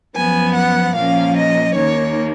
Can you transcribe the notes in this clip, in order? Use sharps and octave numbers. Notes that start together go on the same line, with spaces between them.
F#2 F3 B3 G#5
F#5
A#2 F3 A#3 C#4 F5
D#5
D#2 D#3 A#3 C#5